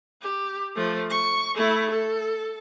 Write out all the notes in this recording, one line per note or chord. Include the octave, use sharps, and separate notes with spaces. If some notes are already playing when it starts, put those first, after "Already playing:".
G4
F3 A3
C#6
A3 E4
A4